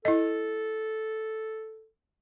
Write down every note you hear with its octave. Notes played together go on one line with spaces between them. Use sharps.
E4 A4 D#5